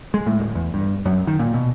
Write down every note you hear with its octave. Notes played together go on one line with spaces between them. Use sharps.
G#3
A2
D1
E2
G2
F#2
D#3
A#2
B2